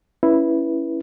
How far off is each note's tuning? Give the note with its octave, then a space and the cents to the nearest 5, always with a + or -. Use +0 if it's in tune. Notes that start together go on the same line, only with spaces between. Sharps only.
C#4 +0 E4 +0 B4 -15